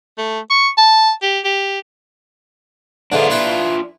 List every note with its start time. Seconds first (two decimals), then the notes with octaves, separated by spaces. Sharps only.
0.18 A3
0.51 C#6
0.78 A5
1.22 G4
1.45 G4
3.12 G#2 D3 E3 D4 F4
3.30 E4 B4 B5